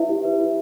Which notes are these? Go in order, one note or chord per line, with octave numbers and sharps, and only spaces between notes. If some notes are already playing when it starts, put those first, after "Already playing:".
Already playing: E4 B4 E5
G4
B4
E4